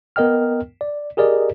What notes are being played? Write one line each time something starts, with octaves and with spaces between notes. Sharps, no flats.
B3 A#4 D#5 G5 F6
D5
G4 G#4 A#4 D5 D#5